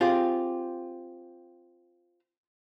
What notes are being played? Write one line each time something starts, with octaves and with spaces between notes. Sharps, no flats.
C4 F4 G4 G#4